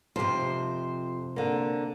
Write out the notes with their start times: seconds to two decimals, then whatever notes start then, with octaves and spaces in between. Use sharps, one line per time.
0.16 F2 C3 G4 C5
1.36 D3 A#3